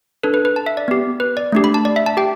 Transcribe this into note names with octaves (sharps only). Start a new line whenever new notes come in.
D4 A4 B4
B4
B4
A5
E5
D5
B3 G4
B4
D5
A3 D4 G4
B5
A5
D5
E5
A5
G4 G5